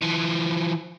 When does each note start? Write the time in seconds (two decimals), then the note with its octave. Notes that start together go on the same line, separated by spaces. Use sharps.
0.02 E3 F3